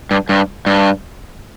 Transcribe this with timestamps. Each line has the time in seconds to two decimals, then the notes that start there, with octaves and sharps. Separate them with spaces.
0.11 G2
0.29 G2
0.66 G2